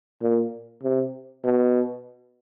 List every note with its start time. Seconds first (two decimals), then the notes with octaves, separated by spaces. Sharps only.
0.22 A#2
0.84 C3
1.45 B2